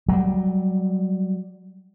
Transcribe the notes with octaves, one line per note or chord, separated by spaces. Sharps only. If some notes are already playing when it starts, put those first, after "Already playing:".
F#3 G3